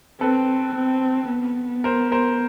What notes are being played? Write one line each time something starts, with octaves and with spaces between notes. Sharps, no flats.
C4 A4 B4
C4
B3
A#4 C5
A#4 C5